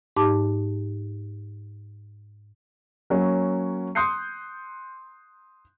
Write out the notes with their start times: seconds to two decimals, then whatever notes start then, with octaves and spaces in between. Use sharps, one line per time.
0.17 G#2 D#4 G4 A5 D6
3.10 F#3 A#3 C#4
3.95 C6 D#6 F#6 G6 C7 C#7